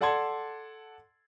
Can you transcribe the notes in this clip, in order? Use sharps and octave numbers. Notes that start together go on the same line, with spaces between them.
A4 D5 F#5 A5 C6 G#6